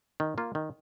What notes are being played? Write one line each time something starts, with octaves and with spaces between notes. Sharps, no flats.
D#3
A#3 F4
D#3